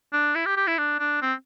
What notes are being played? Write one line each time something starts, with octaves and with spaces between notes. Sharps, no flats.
D4
E4
G4
G4
E4
D4
D4
C4